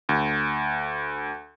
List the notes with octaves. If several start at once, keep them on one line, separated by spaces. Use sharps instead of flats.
D2